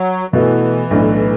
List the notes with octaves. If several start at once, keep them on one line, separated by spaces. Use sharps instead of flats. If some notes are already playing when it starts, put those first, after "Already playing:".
Already playing: F#3
B2 E3 A3 F#4 A4
B1 A2 A3 D4